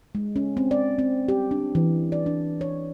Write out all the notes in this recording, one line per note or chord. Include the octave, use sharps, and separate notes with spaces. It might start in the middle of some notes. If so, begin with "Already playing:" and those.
G#3
C#4
C4
D5
C4
G4
D4
E3
D5
D4
C#5